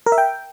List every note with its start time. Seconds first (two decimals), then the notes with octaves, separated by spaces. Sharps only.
0.06 A#4
0.12 E5
0.18 G5